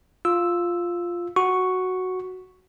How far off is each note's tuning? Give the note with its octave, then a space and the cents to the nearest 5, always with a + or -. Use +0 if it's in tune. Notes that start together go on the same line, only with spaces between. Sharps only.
F4 +0 E6 +0
F#4 +0 C#6 +0